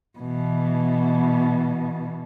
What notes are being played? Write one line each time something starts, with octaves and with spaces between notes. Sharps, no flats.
B2 E3